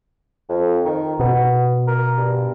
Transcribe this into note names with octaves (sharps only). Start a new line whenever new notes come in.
F2
D#3
B2 B3
A#4
G2